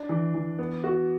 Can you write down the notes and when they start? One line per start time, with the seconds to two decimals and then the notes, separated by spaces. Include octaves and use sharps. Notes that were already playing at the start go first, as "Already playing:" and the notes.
Already playing: D4
0.09 E3
0.34 E3
0.59 B3
0.84 F#4